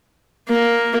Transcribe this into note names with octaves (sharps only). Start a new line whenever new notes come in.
A#3